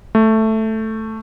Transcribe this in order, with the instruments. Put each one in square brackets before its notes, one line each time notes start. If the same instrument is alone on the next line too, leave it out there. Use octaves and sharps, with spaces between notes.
[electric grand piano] A3